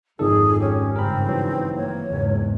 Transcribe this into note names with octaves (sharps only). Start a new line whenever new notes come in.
G#1 F2 D#3 F3 G#4 A4
C#4 G4
G2 C#3 C4 A#4 B5
E3 F#3
A#3 C#5
F#1 E2 G#2